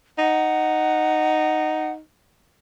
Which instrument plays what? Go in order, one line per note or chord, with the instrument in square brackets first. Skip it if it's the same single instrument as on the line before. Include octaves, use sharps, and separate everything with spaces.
[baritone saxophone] D#4 [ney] F#5